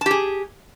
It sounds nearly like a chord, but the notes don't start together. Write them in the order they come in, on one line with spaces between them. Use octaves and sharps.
A5 G4 G#4